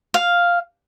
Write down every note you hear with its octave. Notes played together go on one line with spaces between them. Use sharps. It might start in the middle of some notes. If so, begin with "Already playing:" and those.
F5